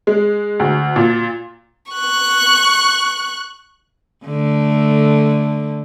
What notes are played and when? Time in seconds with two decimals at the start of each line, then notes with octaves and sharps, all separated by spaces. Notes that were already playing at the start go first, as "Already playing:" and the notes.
0.07 G#3
0.60 D2
0.96 A#2
1.92 C#6 F#6
4.25 D3 A3